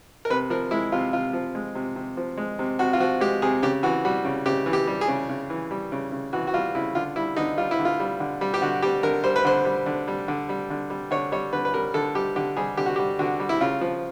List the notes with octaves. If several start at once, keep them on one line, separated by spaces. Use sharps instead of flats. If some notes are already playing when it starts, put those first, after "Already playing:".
A#4
C3 B4
F3 A#4
G#3 E4
C3 F4
C3 F4
F3
G#3
C3
C3
F3
G#3
C3
C3 F#4
F4
F3 F#4
G#3 G4
C3 G#4
C#3 G4
E3 F#4
G3 F#4
C#3
C#3 G4
E3
G4
G3
G#4
C#3
C#3
E3
G3
C#3
C#3
E3 F#4
F#4
G3 F4
C#3 E4
D3 F4
G3 E4
D3 D#4
G3 F4
E4
D3
F4
G3
D3
G3
G4
D3 F#4
G3 G4
D3 A#4
G3 C5
B4
D3 C5
G3
D3
G3
D3
G3
D3
G3
D3 C#5
G3 C#5
D3 B4
B4
G3 A#4
D3 A4
G3 G4
D3 G4
G3 G#4
D3 G4
F#4
G4
G3
D3 F#4
G3
E4
C#3 F4
F3